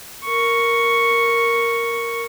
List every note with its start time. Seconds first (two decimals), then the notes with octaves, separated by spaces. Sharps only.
0.25 A#4 C#6